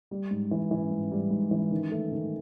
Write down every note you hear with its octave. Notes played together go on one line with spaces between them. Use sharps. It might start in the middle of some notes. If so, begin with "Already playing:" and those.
G3
G#2
E3
E3
G#2
G3
G#2
E3
D#3
A3
D#3